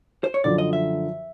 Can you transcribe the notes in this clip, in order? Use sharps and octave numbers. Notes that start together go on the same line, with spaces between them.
C5
C#5
F#2 D3 F3 D5
D#5
E5